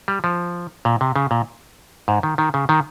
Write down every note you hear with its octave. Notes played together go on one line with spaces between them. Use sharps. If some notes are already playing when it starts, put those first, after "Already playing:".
G3
F3
A#2
C3
C#3
A#2
G#2
D#3
D#3
C#3
D#3